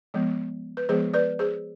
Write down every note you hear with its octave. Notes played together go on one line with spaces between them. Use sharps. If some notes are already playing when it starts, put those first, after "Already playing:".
F3 G#3 B3
B4
F3 G#3 B3 G#4 C5
B4 D5
G#4 C5